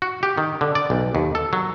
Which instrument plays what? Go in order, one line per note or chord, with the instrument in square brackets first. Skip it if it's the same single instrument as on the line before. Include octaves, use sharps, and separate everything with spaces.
[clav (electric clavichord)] F#4
G4
D#3
D3
D5
B1
D#2
A4
F#3